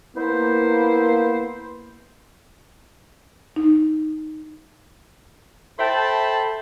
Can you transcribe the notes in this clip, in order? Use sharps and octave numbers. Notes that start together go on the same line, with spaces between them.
A#3 B3 E4 C5
D#4
A4 C5 E5 G5 A5 B5